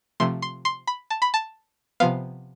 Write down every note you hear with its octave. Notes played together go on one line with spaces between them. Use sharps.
C3 F3 A3 C6
C6
C6
B5
A5
B5
A5
C3 F3 B3 F5